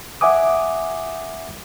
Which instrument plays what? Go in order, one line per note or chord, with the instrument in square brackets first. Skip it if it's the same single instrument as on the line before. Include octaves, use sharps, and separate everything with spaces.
[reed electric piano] E5 F#5 G#5 D6 D#6